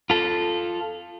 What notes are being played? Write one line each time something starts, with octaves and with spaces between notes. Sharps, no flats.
F4 A4